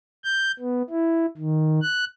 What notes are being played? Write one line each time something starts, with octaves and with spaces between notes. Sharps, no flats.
G6
B3
E4
D#3
F#6